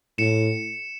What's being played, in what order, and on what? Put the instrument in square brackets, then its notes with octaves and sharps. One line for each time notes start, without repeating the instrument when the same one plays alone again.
[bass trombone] A2 [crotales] C#7 E7